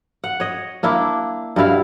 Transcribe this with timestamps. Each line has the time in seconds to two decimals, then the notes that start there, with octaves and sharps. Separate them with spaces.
0.24 F#5
0.40 C#5 D#5
0.83 A#3 D4 E4
1.56 G2 B2 E4 F5